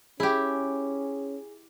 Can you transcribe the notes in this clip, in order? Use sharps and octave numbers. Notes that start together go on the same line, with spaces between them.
C#4 E4 G4 G#4